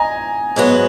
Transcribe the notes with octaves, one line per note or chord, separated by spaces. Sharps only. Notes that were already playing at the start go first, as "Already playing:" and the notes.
Already playing: D#5 G#5 A#5
G#2 F#3 B3 F#4